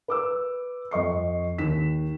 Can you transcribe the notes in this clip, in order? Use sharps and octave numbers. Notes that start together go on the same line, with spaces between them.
B4 D6 E6
F2 D#5 C#6 C7
D#2 B6 E7